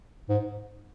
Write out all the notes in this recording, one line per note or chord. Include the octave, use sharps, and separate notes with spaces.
G#2